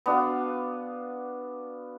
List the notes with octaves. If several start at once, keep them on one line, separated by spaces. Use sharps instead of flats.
B3 D4 F#4 F5